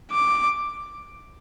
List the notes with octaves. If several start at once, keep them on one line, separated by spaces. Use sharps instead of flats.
D6